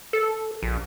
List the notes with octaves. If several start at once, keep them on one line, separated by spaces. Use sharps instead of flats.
A4
A#1